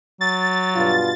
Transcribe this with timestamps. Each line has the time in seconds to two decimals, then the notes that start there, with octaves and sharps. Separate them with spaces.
0.21 F#3 A6
0.75 G2 B2 F4